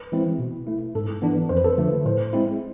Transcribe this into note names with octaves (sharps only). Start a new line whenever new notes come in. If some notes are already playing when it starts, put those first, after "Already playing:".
Already playing: B4
E3 G#3 C4 E4
B2
A3 E4
G#2 A4
E3 B3 D4
F2 C5
B4
A4
B4
D3 F3 A3
A2 C5
G#3 C4 E4